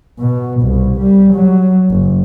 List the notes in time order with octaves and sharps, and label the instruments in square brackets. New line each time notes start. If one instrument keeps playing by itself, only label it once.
[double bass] B2
C2
G3
F#3
F#1